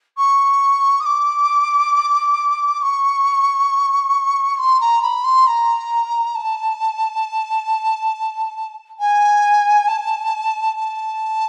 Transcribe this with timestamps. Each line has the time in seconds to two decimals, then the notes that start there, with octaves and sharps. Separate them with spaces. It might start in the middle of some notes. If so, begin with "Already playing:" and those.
0.17 C#6
1.00 D#6
1.05 D6
2.82 C#6
4.59 C6
4.80 A#5
5.02 B5
5.24 C6
5.47 A#5
6.35 A5
8.99 G#5
9.88 A5
10.76 A5